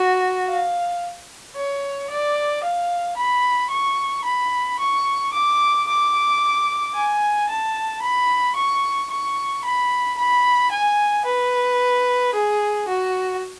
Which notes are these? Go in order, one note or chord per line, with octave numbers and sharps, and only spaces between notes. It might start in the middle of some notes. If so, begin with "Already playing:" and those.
Already playing: F#4
F5
C#5
D5
F5
B5
C#6
B5
C#6
D6
D6
G#5
A5
B5
C#6
C#6
B5
B5
G#5
B4
G#4
F#4